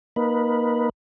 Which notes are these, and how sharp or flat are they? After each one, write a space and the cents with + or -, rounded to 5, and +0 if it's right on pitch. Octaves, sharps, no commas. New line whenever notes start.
A#3 +20 D#4 -5 B4 +0